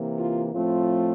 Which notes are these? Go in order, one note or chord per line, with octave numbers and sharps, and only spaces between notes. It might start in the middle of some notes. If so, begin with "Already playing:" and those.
Already playing: C3 E3 A#3
F4
A2 F3 A3 C4 F4